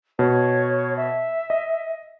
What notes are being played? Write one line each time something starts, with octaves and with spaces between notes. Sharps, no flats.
B2 C#5
E5
D#5